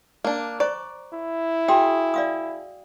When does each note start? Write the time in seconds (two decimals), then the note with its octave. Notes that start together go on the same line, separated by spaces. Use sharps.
0.24 A#3 D4
0.60 C5 D5 A#5 C#6
1.13 E4
1.68 F#4 G#4 G5
2.14 D5 F5 D#6